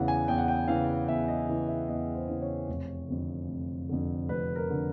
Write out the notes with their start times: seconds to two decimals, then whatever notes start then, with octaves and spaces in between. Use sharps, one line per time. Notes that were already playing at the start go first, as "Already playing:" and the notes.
Already playing: E2 C#3 E3 F#5
0.08 G#5
0.28 E2 G5
0.38 F#5
0.48 G5
0.68 C#3 E3 F5
1.08 E2 E5
1.28 D#5
1.48 C#3 E3
1.69 E5
1.88 E2 D#5
2.15 C5
2.28 C#3 E3
2.42 C#5
2.68 F1
3.08 F2 D3
3.49 F1
3.89 F2 D3
4.29 F1 B4
4.56 A#4
4.70 D3